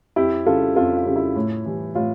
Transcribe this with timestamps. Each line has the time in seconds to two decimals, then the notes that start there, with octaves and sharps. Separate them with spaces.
0.16 F2 E4 G4
0.46 C#3 G3 F4 A4
0.76 F2 F4 A4
0.96 F4
1.06 C#3 G3
1.16 E4
1.36 A2
1.65 E3 G3
1.95 A2 F4